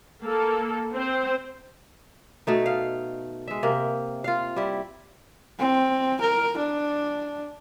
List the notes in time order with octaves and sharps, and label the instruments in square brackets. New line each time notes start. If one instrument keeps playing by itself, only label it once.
[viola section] A#3 A4
C4 C5
[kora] B2 A3 D#4
F5
G#3 E5
C3 A#3
F4 F5
G3 E4
[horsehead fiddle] C4
A#4
D4